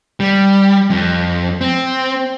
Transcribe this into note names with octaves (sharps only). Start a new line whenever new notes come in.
G3
F2
C4